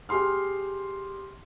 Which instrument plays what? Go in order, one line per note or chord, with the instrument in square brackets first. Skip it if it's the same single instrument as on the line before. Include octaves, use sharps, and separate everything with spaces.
[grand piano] G4 G#4 C6 F6